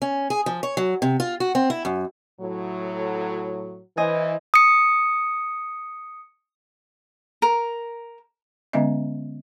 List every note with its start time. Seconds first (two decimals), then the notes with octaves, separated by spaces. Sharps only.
0.02 C#4
0.30 G#4
0.46 F3
0.63 C#5
0.77 F#3
1.02 C3
1.20 F4
1.40 F#4
1.55 C4
1.70 E4
1.85 F#2
2.41 A2 F#3
3.97 E3 C5 D#5 G#5
4.54 D#6 C#7
7.42 A#4
8.73 D3 G#3 B3 C#4 D#5 E5